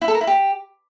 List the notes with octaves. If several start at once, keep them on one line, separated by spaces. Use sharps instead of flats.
E4
A4
A#4
E4
G4